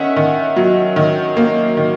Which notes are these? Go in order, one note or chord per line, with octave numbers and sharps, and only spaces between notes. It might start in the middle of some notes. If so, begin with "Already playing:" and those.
Already playing: D#3 C#4 E5 F#5
D#3
F#3
D#3
A#3
D#3